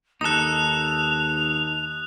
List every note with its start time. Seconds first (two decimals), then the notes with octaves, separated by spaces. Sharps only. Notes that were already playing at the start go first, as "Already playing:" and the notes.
0.21 D#2 D#4 A4 D#6 F#6 F7